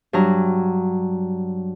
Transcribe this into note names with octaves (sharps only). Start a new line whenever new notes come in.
G2 F#3 A#5